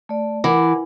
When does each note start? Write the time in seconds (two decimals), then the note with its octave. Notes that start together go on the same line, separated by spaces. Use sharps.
0.09 A3 D5
0.44 E3 A#4 F#5 D6